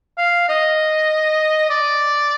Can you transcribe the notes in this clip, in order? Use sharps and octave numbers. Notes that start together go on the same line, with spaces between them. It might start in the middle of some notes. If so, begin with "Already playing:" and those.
F5
D#5
D5